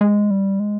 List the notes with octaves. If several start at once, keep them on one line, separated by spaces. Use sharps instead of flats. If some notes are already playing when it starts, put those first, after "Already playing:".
G#3
G3
G#3